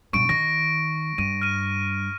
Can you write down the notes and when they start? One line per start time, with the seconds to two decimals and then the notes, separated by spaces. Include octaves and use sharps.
0.13 G2 B2 C#6 D7
0.29 D#3 A#6
1.18 G2 D#7
1.42 F6 D#7